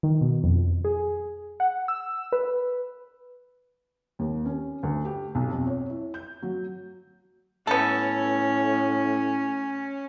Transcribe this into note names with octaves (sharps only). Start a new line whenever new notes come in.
D#3
B2
F2
G#4
F#5
E6
B4
D#2
C#4
D2
G4
B1
F2
C#5
E4
G6
F#3
A2 B3 C#4 A4